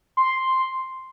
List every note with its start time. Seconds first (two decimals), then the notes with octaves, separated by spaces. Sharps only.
0.17 C6
0.39 C6